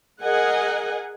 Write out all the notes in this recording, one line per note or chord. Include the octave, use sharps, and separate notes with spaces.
G#4 A#4 D#5 F#5 G#5